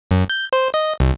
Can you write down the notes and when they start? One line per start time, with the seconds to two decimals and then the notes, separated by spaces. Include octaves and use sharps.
0.11 F#2
0.30 G6
0.53 C5
0.74 D#5
1.00 C2